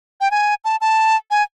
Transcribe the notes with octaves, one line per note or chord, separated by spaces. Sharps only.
G5
G#5
A5
A5
G#5